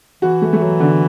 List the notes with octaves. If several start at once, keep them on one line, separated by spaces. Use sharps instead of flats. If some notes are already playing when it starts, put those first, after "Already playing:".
E3 F#4
A3
A3
F#3
D3